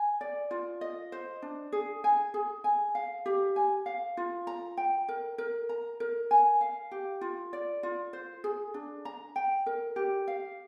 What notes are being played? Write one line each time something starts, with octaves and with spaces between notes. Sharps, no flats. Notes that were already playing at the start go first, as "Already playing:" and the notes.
Already playing: G#5
D5
F4
D#5
C5
D4
G#4
G#5
G#4
G#5
F5
G4
G#5
F5
F4
A#5
G5
A#4
A#4
A#5
A#4
G#5
F5
G4
F4
D5
F4
C5
G#4
D4
A#5
G5
A#4
G4
F5